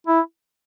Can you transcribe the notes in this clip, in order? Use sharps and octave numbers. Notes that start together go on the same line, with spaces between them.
E4